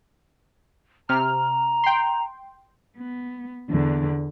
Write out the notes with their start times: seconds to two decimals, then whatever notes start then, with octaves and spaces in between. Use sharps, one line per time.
1.09 C3 A#5 F6
1.84 G5 C6
2.97 B3
3.70 E2 D3